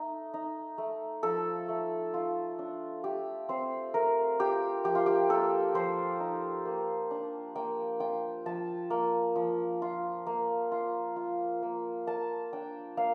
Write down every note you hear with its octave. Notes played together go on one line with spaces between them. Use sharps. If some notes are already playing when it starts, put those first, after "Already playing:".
Already playing: A3 D#4
D#4
A3
F3 A4
A3
F4
D4
A3 G4
C4 C5
A3 A#4
F4 G4
F3 G4
F4
G4
A#3 A4
F3 C5
D#4
A#3
D4
A#3 G5
F4 G5
F3 A5
A#3
F3
F4
A#3
F4
F4
A#3
A#3 A5
D4 G5
A#3 F5